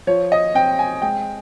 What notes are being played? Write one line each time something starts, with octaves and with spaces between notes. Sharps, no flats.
F3 C#5
D#5
C4 G5
G#5
G#3 G5